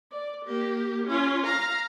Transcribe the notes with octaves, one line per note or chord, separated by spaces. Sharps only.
D5
A#3 G4
C#4 F4
F5 A#5